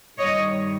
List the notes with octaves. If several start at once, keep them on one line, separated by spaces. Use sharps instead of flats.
G2 D#3 G3 C#5 D#5